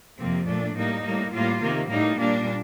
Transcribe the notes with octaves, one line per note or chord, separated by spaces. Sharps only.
F2 C3 F3 A#3 C4
A#2 A3 D4
A2 G3 A#3 D#4
A2 G3 A#3
A2 G3 A#3 F4
C3 D#3 A#3
A2 G3 A#3 D#4
A#2 G3 A#3 D4